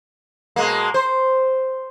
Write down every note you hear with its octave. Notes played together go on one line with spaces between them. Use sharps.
B2 G#3 A#3
C5